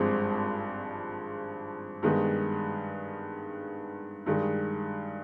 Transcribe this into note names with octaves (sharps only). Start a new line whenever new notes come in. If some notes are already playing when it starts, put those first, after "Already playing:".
Already playing: G#1 G2 F3 G#3 C4
G2 D#3 G#3 B3
G2 D#3 G#3